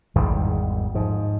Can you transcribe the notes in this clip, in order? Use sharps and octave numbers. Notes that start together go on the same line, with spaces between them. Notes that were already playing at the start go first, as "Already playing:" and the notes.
G#1 E2 D#3 G3
G#2 F3